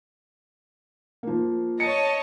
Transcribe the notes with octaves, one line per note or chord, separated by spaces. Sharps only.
F3 A#3
C#5 D#5 A5 C#7